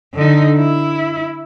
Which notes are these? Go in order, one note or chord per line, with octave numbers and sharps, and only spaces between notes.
D3 D#4
E4